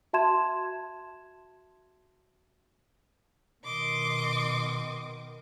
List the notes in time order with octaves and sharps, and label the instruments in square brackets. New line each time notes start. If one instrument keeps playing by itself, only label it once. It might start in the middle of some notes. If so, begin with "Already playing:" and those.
[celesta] F#4 E5 A5 C6 G#6 E7
[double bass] B2 D#3 [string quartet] D#5 C6 D6